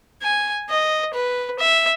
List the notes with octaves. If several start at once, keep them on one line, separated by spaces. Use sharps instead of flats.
G#5
D#5
B4
E5